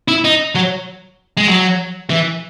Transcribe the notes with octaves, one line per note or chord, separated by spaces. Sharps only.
E4
D#4
F#3
G#3
F#3
E3